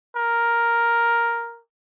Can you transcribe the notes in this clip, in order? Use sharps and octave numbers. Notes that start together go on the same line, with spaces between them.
A#4